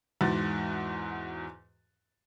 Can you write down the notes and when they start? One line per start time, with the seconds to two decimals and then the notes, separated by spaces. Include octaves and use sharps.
0.21 E2 G#2 F#4 A6